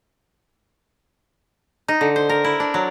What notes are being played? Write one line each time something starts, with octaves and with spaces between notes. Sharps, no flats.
D#4
D3
C5
A#4
E4
D4
F#3